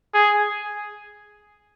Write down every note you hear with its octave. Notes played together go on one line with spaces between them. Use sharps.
G#4